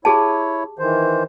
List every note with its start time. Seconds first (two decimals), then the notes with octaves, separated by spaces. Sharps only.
0.05 E4 G4 G#4 C#5 A5
0.79 D#3 E3 C5